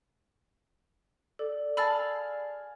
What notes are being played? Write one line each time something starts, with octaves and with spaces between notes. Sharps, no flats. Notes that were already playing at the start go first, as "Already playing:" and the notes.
A4 D5
G#4 F5 A5 B5 E6 A6